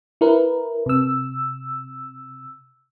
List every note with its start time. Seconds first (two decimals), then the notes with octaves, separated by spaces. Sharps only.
0.21 E4 A#4 B4
0.86 C3 E6